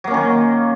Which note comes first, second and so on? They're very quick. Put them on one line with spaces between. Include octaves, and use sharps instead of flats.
F#3 A#3 C#4 D#3